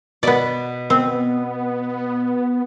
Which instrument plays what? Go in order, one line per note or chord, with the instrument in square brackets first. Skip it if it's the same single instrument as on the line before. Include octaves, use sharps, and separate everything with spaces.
[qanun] B2 B5 D6 [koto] B3 D5
[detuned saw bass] B3 [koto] C4